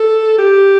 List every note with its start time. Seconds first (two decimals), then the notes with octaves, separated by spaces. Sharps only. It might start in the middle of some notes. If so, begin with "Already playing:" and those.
Already playing: A4
0.38 G4